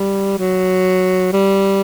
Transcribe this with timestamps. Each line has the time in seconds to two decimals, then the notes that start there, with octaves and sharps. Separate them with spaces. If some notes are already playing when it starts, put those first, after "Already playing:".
Already playing: G3
0.39 F#3
1.33 G3